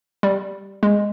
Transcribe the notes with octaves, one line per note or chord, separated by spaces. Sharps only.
G3
G#3